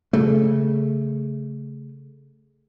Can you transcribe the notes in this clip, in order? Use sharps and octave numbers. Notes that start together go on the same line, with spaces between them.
C#3 A3